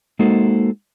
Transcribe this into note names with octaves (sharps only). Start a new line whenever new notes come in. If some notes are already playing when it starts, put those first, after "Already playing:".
G#3 A#3 D#4 F#4 A4 C5